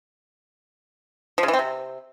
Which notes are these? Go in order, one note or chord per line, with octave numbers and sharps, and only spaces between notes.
F3
C#3
E3
C4
C3